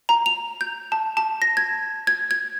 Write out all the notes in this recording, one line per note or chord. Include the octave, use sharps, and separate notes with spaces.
A#5
F7
G6
A5
A5
A#6
G#6
G#6
G#6